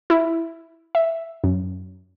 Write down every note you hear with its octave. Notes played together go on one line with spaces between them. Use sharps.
E4
E5
F#2